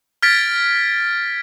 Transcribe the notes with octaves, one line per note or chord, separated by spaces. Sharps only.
F6 G#6 A6 B6 D7